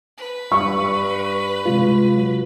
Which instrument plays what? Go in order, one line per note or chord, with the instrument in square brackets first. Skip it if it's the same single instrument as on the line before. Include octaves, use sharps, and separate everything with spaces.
[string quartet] B4
[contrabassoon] G2 [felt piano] C#6
[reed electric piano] C3 G#3 F4
[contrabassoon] F#3